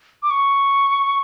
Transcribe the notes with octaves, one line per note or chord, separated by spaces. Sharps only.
D6
C#6